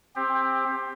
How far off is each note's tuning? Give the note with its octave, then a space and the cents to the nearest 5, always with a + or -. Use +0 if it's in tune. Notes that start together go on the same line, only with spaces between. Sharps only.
C4 +10 G4 +25